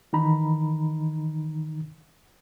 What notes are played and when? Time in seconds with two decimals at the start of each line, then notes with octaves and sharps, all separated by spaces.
0.13 D#3 E3 D#4 A#5 B5